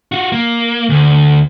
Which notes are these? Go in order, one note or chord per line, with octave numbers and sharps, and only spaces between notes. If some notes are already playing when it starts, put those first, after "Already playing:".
F4 F#4
A#3
D2